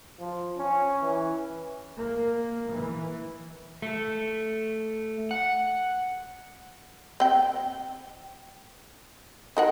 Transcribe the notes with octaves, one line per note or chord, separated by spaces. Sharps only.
F3
C#4
E3
A#3
E3
A3
F#5
C4 G5
D#4 A#4 F#5